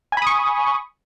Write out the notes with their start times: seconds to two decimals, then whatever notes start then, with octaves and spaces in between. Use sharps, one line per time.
0.12 G#5
0.17 B5
0.22 D#6
0.27 C#6